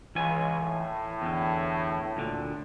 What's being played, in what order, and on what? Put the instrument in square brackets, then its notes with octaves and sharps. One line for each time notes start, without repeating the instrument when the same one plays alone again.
[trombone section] C#2 [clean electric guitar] E3 G#5
[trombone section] A2
[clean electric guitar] E2 D3
D2 A#2 D3